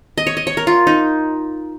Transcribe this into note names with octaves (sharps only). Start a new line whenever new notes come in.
D#5
C#5
D#5
C#5
A#4
F4
D#4